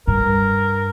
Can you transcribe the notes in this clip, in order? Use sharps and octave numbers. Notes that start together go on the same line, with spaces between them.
G2 A#4